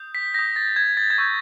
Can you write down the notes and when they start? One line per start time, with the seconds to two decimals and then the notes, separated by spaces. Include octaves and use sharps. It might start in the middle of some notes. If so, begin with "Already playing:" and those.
Already playing: D#6 G6
0.15 B6
0.34 D#6 G6 A#6
0.56 A6
0.76 G#6
0.97 A6
1.10 G#6
1.18 C#6 E6 G6 A6